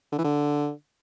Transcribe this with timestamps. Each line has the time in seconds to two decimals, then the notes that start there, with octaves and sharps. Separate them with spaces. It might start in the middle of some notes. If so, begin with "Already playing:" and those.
0.12 D3
0.18 E3
0.24 D3